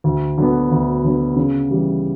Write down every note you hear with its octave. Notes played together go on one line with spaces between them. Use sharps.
D2
D3 F#3 B3
D2
D3 F#3 B3
C#3
E3 G3